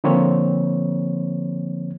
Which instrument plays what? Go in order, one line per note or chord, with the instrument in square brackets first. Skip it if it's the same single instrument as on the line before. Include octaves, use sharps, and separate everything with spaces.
[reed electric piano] D3 F3 A#3 C4 C#5